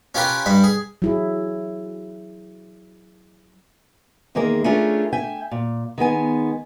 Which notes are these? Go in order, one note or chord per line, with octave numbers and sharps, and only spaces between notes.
C#4 F4 G4 A#4 B4
G2 G3 B5
G#4
F#3 E4 G#4
E2 D#3 G#3 A#3 G#4 A#4
A3 C#4 D4 F4 G#4 A#4
E5 G5 G#5
A#2
D#3 G#3 B3 G#5